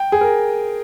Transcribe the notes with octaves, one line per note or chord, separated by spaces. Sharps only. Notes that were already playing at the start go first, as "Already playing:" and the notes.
Already playing: G5
G#4
A#4